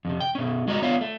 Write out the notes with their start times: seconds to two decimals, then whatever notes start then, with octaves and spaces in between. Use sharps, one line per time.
0.05 F2 C3
0.21 G5
0.35 B2 C#4
0.67 G#3 F#4 D5 D#5 A#5
0.82 B3 F4 C#5 D5 E5 F5
1.01 A3